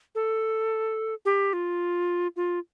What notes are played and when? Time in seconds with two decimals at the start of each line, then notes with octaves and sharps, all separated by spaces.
0.15 A4
1.25 G4
1.53 F4
2.36 F4